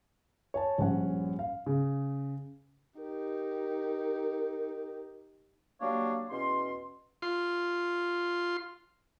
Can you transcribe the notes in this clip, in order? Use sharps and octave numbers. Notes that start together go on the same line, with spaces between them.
C#5 G#5 A5
A#1 G2 C#4 F#5
F5
C#3
D#4 G4 A#4
F#3 G3 A#3 D4 C#5 F5
E2 B2 C#4 C6
F4 C6